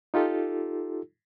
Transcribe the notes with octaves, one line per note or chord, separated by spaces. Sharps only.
D#4 F4 G4 A4